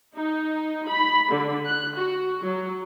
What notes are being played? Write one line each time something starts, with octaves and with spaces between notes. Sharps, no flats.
D#4
B5
D3
F#6
F#4
F#3